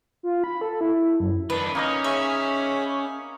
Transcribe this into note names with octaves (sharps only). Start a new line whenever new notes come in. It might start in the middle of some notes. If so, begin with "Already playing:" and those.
F4
B5
A4
E4
F#2
D#3 D4 B4
A#3 C#4 D#4 D#5
G#4 C#5 E5 B5